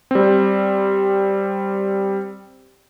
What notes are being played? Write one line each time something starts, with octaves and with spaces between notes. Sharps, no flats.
G3 C4